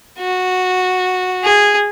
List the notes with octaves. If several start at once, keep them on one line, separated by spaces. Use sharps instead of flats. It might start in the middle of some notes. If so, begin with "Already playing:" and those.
F#4
G#4